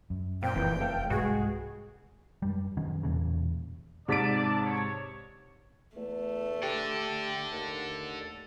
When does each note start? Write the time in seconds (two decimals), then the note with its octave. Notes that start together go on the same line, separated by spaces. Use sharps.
0.10 F#2
0.43 A#2 C4 F5 G5
0.56 F1 E3 A#3 C4
0.80 A3 A4 F5
1.10 C2 G#2 G#3 F#4 G#4 B4
2.42 F#2 G3
2.77 F#2 D#3 F#3 C#4
3.03 E1 E2 A#2 C#3
4.08 G#2 C3 D5 A5 B6 D7
4.63 C#5
5.96 E2 A3
6.63 G4 A4 D5
7.52 D#2